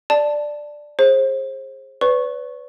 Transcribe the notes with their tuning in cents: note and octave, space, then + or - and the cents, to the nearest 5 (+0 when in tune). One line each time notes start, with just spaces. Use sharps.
D5 +5 A5 +0
G#4 +0 C5 +30
B4 +20 D5 -45 C#6 -10